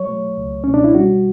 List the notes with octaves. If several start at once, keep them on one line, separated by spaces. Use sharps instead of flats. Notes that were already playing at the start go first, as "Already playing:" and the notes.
Already playing: F#3 C#5
A3
C#2
B2 C#4
D4
E4
G3 F#4